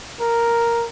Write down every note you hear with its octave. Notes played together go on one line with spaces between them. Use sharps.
A#4